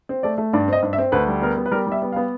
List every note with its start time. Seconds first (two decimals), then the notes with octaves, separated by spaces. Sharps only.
0.09 C4
0.23 A3 D5
0.38 A3
0.53 G2 D5
0.68 C4 D#5
0.82 G2
0.93 E5
0.98 C4
1.12 D2 B4
1.27 G3
1.42 B3 A#4
1.57 B3
1.66 B4
1.72 G3 A#4
1.87 G3
1.92 E5
2.02 B3
2.12 F5
2.16 B3